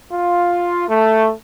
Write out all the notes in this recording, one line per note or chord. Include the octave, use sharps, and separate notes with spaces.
F4
A3